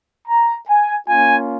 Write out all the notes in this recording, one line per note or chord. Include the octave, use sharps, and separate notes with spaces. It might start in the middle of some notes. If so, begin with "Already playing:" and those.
A#5
G#5
A#3 C#4 F4 G#5